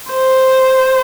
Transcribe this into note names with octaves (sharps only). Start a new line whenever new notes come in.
C5